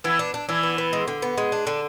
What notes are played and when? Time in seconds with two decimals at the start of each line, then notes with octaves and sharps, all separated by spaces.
0.04 E3 B3 E4
0.19 D4
0.34 D4
0.49 E3 D4 E4
0.63 B3
0.78 B3
0.93 G#3
1.08 D3
1.22 B3
1.38 G#3
1.52 D4
1.67 D3